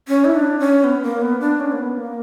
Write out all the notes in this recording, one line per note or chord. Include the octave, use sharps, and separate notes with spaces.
C#4
E4
D4
C#4
B3
A#3
B3
D4
C#4
A#3
B3
A#3